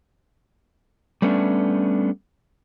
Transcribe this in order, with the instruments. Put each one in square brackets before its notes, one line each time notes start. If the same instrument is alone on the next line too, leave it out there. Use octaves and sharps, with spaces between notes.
[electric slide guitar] G3 A3 B3 C#4 D4